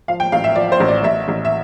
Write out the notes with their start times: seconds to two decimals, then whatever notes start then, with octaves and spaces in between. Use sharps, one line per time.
0.08 F3 F5
0.20 G5
0.32 A1 F5
0.44 E5
0.56 F3 D5
0.72 C5
0.80 A1
0.88 D5
1.03 A1 E5
1.28 A1
1.45 E5